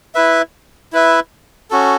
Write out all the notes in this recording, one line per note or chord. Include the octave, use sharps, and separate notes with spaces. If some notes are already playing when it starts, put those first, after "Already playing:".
E4 B4 E5
E4 B4 E5
C#4 F#4 A4